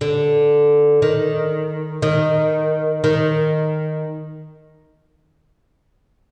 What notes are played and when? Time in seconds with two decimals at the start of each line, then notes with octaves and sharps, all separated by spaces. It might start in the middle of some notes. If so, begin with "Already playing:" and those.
0.01 D3
1.02 D#3
2.02 D#3
3.04 D#3